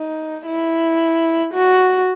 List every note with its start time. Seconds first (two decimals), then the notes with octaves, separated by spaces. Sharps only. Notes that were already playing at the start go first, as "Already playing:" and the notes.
Already playing: D#4
0.47 E4
1.53 F#4